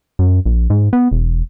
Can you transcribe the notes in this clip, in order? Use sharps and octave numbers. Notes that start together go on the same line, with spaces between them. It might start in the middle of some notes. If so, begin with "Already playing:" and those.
F#2
A#1
G#2
B3
E1